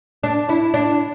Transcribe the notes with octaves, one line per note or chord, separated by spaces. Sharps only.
D4
E4
D4